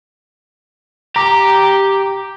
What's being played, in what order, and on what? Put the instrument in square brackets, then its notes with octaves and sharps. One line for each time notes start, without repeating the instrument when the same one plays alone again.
[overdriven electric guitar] G4 [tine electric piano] A#5 D6